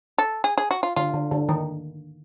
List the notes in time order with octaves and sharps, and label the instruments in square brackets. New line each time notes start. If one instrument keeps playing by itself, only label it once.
[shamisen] A4
G#4
G#4
F#4
F4
[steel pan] D3 [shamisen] F4
[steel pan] D3
D3
D#3